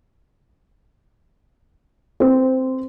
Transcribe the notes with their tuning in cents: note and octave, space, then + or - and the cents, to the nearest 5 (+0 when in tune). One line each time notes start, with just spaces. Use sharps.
C4 +0 C5 -15